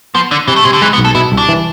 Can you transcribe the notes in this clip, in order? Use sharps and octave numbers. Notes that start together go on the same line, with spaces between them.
F3 B3
D3 D4
C3 E3
A3
C3 G#3
D3
E3 G#3
B3
B1
A4
B2 E4
C2
D4
E3